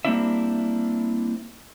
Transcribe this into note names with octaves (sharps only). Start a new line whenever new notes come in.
G3 A#3 C4 D4 E4 E5